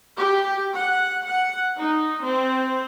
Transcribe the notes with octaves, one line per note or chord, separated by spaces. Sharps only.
G4
F#5
F#5
D#4
C4